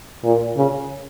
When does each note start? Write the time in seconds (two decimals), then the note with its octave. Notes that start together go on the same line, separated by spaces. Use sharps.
0.24 A#2
0.56 C#3